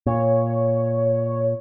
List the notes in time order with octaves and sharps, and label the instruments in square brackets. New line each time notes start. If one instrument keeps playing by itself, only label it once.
[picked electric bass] A#2 [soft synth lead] C#5